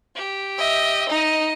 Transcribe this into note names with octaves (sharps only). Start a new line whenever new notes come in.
G4
D#5 E5
D#4 D#5